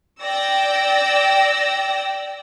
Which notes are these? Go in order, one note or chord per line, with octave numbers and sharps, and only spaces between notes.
D5 G5 E6 A#6